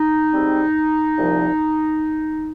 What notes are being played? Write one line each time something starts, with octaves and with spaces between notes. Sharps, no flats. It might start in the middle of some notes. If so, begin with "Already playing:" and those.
Already playing: D#4
G#2 G3 C4
C2 A#2 F3